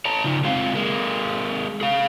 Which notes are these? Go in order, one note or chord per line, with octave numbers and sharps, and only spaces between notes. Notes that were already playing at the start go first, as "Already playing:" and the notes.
C#5 A5 A#5
C#3 D#4 F4
G#3 C4 F4 F5
G#3 A#3
G#4 F5